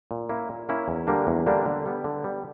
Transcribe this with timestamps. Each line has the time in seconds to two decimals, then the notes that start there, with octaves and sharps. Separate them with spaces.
0.11 A#2
0.29 A#3 C#4 E4
0.49 A#2
0.69 A#3 C#4 E4
0.88 E2
1.07 D3 G3 A#3 D4
1.27 E2
1.46 D3 G3 A#3 D4
1.66 D3
1.86 G3 B3
2.04 D3
2.24 G3 B3